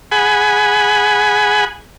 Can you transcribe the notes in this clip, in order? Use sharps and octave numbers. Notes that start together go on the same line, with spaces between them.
G#4 F#5 G#5 B5